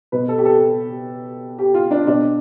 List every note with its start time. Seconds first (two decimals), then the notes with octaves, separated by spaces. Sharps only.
0.12 B2 B4
0.28 A4
0.38 G4
0.45 A4
1.59 G4
1.74 F4
1.91 D4
2.07 B2 D4